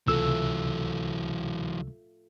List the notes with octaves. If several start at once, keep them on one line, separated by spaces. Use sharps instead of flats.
C#2 C3 E3 F#3 A3 F4 A4 E6